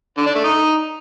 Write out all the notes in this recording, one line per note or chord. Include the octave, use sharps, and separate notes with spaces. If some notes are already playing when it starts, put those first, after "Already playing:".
D3
D4
A3
D#4